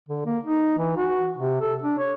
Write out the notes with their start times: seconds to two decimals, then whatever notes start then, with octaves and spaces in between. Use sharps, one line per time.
0.09 D3
0.26 A#3
0.44 D#4
0.78 E3
0.97 F#4
1.37 C3
1.61 A4
1.82 D4
1.98 C#5